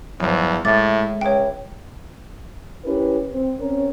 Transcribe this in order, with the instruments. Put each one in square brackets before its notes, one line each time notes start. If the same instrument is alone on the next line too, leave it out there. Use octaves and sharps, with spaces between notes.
[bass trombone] E2 [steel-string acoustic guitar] G2 F3 F#3
[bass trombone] A2 [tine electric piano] G#3 [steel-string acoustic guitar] E5 [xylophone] D6 A6
[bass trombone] C#2 [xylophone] C#5 G5
[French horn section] C#4 E4 G4 A#4 B4
C4
C4 C#4 A#4 C#5